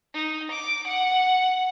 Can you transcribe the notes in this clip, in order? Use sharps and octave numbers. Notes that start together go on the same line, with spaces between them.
D#4
D6
F#5